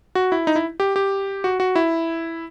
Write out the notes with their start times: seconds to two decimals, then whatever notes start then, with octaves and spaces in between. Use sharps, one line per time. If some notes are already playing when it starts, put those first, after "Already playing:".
0.15 F#4
0.32 E4
0.47 D#4
0.56 E4
0.80 G4
0.96 G4
1.44 F#4
1.60 F#4
1.76 E4